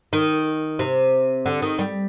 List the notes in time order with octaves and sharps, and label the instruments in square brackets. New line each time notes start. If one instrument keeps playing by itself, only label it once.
[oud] D#3
C3
D3
D#3
G3